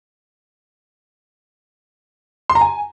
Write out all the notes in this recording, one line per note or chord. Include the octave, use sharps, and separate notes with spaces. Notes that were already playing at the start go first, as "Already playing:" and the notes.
C6
A#5
G#5